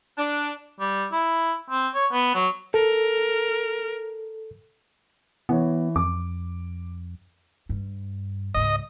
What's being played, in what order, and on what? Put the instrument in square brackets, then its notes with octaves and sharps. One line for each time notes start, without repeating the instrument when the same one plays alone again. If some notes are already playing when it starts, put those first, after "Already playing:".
[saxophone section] D4
[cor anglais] G3
E4
C4
C#5
B3
F#3
[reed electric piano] A4 [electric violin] A#4
[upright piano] E3 E4 C#5 [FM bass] B3
[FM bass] F2 [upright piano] D6
[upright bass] G2
[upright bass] C#2 G#2 [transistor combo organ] D#5